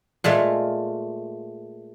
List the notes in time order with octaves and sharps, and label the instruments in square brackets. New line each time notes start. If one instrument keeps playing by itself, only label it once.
[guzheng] A#2 G#3 A3 F5